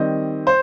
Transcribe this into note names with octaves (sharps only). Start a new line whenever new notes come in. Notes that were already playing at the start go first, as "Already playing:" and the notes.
Already playing: D#3 G3 C4 D#5
C5